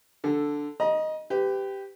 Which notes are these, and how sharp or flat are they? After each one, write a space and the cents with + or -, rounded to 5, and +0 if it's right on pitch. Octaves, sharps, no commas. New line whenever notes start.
D3 +0 A4 +0
D#5 +0 A#5 +40
G4 +0 B4 +35